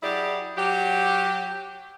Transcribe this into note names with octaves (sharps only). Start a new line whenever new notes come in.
F#3 E4 G4 G#4 D5
F#3 G4